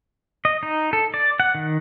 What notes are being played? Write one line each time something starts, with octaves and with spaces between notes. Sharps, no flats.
D#5
D#4
A4
D5
F#5
D#3